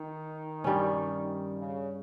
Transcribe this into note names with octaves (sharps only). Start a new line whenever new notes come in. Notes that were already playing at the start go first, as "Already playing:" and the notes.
Already playing: D#3
G2 G3 C#4
C#3